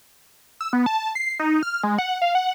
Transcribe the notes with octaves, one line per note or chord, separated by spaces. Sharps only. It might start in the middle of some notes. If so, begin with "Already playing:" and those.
E6
B3
A5
C7
D#4
F6
G#3
F#5
F5
F#5